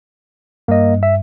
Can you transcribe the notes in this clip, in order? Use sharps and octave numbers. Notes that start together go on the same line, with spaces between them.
G2 A#3 D#5
E5